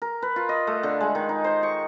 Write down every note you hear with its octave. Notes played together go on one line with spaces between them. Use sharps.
A#4
B4
F4
D#5
A3
D3
G#3
D#3
D#4
C5
C#6